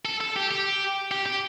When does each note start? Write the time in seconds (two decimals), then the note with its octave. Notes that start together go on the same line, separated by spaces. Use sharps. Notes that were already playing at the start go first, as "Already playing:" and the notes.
0.05 A4
0.21 A4
0.36 G4
0.51 G4
1.11 G4
1.26 G4